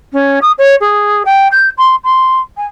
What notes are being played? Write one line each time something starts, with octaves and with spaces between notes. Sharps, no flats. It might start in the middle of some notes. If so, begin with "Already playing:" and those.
C#4
D#6
C#5
G#4
G5
G6
C6
C6
G#5